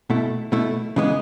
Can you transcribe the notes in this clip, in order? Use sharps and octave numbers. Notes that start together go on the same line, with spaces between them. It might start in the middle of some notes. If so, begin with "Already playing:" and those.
B2 A3 E4
B2 A3 E4
C#3 E3 G#3 B3